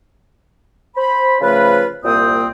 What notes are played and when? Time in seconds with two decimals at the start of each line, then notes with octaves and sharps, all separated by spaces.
0.96 C5 B5
1.41 C#3 F3 A3 F4 B4
2.03 C2 A#2 A#3 C4 G5 D#6